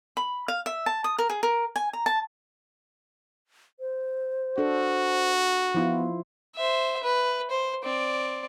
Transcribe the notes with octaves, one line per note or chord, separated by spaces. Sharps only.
B5
F5
E5
A5
D#6
A#4
G#4
A#4
G#5
A#5
A5
C5
D4 F#4 A4
F3 B3 E4 F4
C5 E5
B4
C5
C4 D5